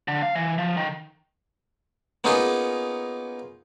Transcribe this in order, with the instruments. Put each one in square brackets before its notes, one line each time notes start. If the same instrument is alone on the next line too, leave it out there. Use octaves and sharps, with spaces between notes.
[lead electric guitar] D3
F5
E3
F3
D#3
[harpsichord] A#3 B3 C#4 D#4 F4 G#4